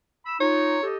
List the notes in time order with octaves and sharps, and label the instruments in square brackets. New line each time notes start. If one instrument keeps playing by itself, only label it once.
[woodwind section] B5 E6
[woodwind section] D#4 F4 [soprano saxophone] C#5
[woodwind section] G4 A4 D#5